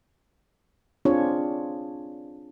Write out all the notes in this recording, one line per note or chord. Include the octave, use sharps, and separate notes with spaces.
C4 D4 F4 G#4 C#5